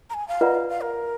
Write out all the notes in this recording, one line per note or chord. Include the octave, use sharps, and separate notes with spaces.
A#5
G#5
F5
F4 B4 D5 D#5 F#5 A#5
F5
F5
A#4